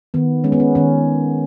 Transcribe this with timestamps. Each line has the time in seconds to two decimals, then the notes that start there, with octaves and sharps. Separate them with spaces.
0.14 D#3 B3
0.44 G#3 C#4
0.52 B3
0.60 C#4
0.75 D#3 C#4